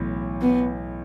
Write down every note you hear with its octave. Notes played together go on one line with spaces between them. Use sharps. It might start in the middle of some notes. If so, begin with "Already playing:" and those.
Already playing: B1 A2 E3
B3